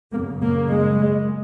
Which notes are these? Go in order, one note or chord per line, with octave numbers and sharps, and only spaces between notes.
F#2 C#3 A#3
A#3
G#3